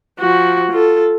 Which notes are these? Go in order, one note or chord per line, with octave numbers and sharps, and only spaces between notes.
F3 F#4
F4 A4